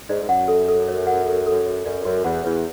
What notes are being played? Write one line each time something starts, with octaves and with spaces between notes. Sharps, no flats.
G#2 D5
G#2
F#2 F#5
A4
A4
C#5
F#5
A4
A4
C#5
F#2 D5
F#2 F#4
E2 F#5
E2 B4